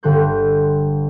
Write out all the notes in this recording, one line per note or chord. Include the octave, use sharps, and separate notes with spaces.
G1 D3 G3 C6 F#6 G6